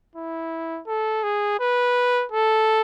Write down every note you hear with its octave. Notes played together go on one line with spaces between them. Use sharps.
E4
A4
G#4
B4
A4